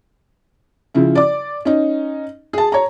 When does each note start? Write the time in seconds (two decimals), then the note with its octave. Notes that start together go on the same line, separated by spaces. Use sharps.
0.94 C#3 F3 E4
1.15 D5 D6
1.65 C#4 D#4
2.53 G#4 A5
2.72 C#5 A#5